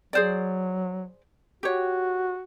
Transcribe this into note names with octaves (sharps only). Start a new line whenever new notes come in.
F#3 G#4 C5 D5
F#4 G4 C#5